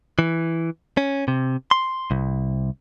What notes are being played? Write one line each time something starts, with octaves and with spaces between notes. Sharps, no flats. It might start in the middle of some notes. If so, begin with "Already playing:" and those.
E3
C#4
C3
C6
C2